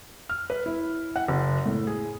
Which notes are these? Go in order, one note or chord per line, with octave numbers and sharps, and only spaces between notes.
F6
B4
E4
F#5
F#1
A2
G#4